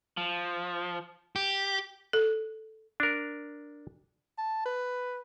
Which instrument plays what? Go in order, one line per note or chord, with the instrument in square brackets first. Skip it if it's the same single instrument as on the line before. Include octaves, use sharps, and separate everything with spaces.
[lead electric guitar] F3
G4
[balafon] A4
[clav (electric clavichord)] D4 A#4
[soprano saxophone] A5
B4